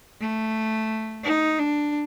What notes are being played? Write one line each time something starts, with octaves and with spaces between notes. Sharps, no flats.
A3
D#4
D4